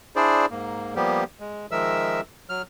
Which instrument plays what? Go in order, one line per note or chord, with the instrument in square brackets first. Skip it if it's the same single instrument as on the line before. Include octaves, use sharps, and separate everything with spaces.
[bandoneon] D4 E4 G#4 C5 D5
G#2 A#3
F3 G3 A#3 B3 G4
G#3
D#3 F3 G#3 A#4 E5 E6
F#3 F6